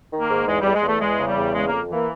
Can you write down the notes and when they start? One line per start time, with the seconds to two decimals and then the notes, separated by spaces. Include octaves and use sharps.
0.10 D#3
0.19 A#3
0.28 G#2
0.46 E2 G#3
0.60 E2 G3
0.73 G#3
0.82 E2 A3
0.99 E2 G#3
1.18 C#3
1.27 G3
1.36 E2
1.53 C#3 G#3
1.67 F2 A#3
1.89 E3 A#3